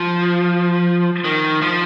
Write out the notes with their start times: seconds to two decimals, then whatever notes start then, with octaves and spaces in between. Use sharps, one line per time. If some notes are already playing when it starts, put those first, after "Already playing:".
Already playing: F3
1.24 D#3
1.62 F3